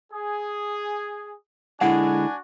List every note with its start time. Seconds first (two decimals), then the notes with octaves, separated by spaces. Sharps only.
0.13 G#4
1.81 D3 G#3 D4 E4 F#4 F#5 G#5